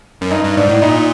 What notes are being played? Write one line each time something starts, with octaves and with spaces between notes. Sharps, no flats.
F#2
G2 D#4
G2
G#2 D4
A2
A#2 D#4